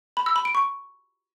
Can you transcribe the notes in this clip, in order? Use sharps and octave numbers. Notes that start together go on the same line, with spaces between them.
B5
E6
B5
D7
C#6